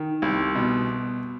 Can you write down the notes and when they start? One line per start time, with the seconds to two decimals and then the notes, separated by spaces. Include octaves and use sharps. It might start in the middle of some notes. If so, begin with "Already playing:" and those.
Already playing: D#3
0.22 C2
0.55 B2